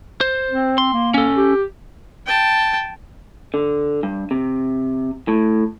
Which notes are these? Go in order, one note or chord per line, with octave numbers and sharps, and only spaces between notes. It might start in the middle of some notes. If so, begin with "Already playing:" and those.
C5
C4
C6
A#3
C#4 A4
G4
G5 A5
D3
G2
C3
A2